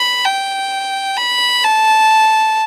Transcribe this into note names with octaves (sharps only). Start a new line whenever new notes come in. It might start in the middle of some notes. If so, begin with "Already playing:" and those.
Already playing: B5
G5
B5
A5